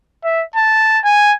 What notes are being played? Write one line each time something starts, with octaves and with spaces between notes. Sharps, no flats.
E5
A5
G#5